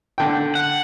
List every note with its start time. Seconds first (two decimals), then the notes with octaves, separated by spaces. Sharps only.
0.18 D3 G5
0.55 F#5